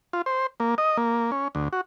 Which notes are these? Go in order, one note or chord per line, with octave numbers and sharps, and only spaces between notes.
F4
C5
A#3
D#5
A#3
C#4
D2
F#4